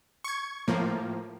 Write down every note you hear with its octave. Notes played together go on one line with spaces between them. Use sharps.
C#6 G#6
A2 F3 A#3